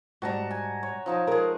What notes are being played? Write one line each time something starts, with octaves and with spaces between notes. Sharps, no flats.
G#2 G3 F#4 A5 A#5
G#5
C#5
F3 D#4 A5
G#3 G#4 A#4